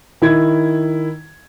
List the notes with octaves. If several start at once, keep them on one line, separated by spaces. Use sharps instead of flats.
D#3 E4 G#6